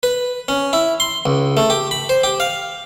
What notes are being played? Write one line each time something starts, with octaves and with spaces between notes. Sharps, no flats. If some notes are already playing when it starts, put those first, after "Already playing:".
B4
C#4
E4
C6
C#2
A3
G4
B5
C5
G4
F5